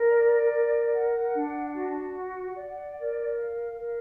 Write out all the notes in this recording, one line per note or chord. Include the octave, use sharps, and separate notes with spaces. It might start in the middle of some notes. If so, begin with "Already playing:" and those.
Already playing: A#4
D5
A#4
F#5
D4
F#4
F#5
D5
A#4
F5
A#4